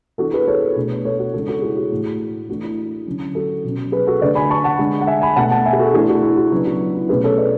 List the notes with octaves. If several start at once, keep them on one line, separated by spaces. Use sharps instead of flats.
E3 B3 D4 F#4 A4
G#4 B4
A4 C#5
B2 A3 D4
A4 C#5
F#4
C#3 E3 G#3 D4 F#4 A4
F#4 A4
E4 G#4
F#4
A2 E3 A3
E3 A3 D4 F#4
E4
D3 F#3 C#4
F#4 A4
B2 F#3 C#4
G#4 B4
F#4 A4
D3 A3 D4 B4 D5
G#5 B5
A5 C#6
F#5 A5
D3 G#3 D4
F#5
E5 G#5
G#5 B5
B2 A3 D4 F#5 A5
F#5 A5
E5 G#5
G#4
F#4 A4
E3 A3 D4 E4 G#4
F#4
E4
F#4
C#3 F#3 B3 D4 E4
F#4
E4
B2 A3 C#4 G#4 B4
A4 C#5
B4 D5